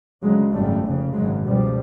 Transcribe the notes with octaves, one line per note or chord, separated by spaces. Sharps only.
D2 C#3 F#3 G#3
G#1 F#2 C#3 G3 A3
F1 F2 C#3
G#1 F#2 C#3 F#3 G#3
C#2 B2 F3 G3